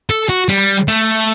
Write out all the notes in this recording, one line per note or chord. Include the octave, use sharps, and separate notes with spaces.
A4
F#4
G3
A3